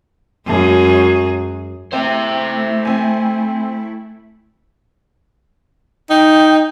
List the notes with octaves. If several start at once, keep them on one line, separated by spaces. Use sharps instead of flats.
F#2 G#3 G#4
A3 C4 E4 C5 E5
C4 G#5
D#4 G5